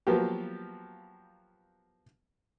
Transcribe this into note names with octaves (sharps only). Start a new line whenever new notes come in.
F3 F#3 A#3 B3 G4